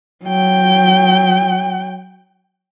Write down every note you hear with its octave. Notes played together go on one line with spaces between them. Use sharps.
F#3 G5